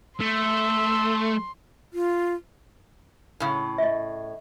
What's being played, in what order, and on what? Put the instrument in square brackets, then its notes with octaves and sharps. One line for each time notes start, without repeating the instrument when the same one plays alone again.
[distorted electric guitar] A3 [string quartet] C6 [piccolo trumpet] E6
[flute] F4
[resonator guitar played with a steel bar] A2 C#3
[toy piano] D#5 E5